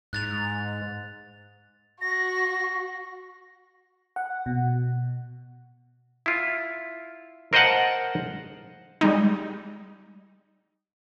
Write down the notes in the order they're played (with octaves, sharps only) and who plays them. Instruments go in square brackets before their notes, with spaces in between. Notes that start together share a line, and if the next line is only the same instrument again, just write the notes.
[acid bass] G#2 [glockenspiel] F#6 A6 F7
[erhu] F#4 [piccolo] A#6
[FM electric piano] F#5
B2
[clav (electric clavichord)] E4 F4
A#4 C5 D#5 F5 F#5 A5
[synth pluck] G3 G#3 D#4